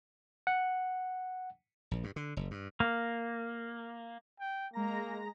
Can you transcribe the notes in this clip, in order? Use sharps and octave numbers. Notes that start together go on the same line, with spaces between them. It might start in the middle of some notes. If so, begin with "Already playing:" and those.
F#5
A#1
G2
D3
F#1
G2
A#3
G5
G#3 A#3 A#5 A#6